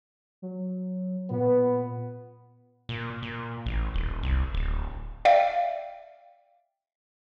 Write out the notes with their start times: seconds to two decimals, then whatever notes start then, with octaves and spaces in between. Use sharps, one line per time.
0.42 F#3
1.30 A#2 B3
2.89 A#2
3.22 A#2
3.66 A1
3.94 D#1
4.23 C2
4.54 D1
5.25 D5 E5 F5 G5